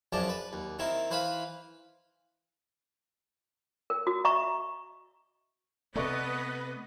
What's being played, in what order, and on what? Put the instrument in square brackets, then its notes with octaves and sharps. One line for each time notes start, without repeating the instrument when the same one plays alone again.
[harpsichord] F#2 F3 G#3 D4 A5 D6
B4
D#2
D#3 C4 E4 A#4
E3 B4 C5 F5 B5
[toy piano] A#4
F#4
D#5 E5 A#5 C#6
[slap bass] C3 A3 [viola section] B3 B4 D#5 [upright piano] A4 D5 C#6